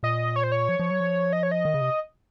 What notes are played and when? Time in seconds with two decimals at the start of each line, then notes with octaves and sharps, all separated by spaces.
0.03 A#2 D#5
0.36 C#5
0.43 C5
0.52 C#5
0.69 F3
0.79 F3
0.90 F#3
1.00 F3
1.33 D#5
1.43 C#5
1.51 D#5
1.65 D#3
1.74 C#3
1.81 C3